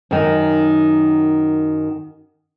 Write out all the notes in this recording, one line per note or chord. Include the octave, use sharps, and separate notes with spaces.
F#2 D#3